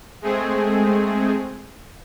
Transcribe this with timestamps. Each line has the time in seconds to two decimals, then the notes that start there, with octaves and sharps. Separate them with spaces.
0.22 G#3 A3 C4 G#4